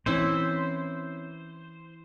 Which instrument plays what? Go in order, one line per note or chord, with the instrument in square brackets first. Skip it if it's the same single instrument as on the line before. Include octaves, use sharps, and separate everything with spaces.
[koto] E3 E4 [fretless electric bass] C4 C#4 [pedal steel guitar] C5